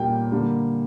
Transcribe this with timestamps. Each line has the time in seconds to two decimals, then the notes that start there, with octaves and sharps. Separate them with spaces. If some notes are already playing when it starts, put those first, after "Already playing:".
Already playing: A#2 G3 A#3 G5
0.32 D3 G3 A#3